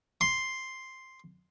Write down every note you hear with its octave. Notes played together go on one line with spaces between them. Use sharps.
C6